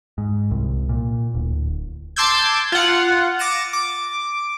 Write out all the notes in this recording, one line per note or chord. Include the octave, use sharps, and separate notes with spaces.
G#2
C2
A#2
D1
A5 C6 D6 E6 G6 G#6
F4 F#5
D6 A6 A#6 C#7 D#7 E7
D6